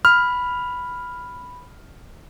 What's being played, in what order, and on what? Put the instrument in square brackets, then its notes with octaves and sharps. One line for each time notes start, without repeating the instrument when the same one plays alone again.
[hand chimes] B5 [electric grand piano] F6